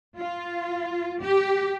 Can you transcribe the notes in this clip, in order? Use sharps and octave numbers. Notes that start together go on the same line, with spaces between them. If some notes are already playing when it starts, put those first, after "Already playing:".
F4
G4